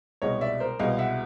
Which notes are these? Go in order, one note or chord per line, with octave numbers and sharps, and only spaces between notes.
C2 B2 G#3 C#5 D#5
D5 E5
A#4 C5
C2 B2 G#3 D#5 F5
E5 F#5